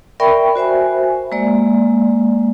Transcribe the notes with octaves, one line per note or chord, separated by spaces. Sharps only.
A#4 D5 E5 G5 B5 C#6
F#4 C5 E5 G#5
G#3 A#3 D5